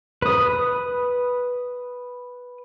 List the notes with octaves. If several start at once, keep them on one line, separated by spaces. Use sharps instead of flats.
B4 D#6